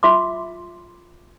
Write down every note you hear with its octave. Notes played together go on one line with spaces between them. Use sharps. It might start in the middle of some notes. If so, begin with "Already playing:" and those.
F4 E5 C6 D6